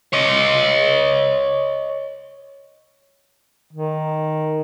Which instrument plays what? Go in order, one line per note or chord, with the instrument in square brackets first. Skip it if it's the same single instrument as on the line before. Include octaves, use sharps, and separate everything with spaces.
[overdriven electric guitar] C#5 D#5
[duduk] D#3